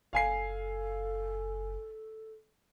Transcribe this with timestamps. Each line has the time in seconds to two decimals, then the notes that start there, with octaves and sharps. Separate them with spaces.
0.13 F#1 A4 F5 G#5 C7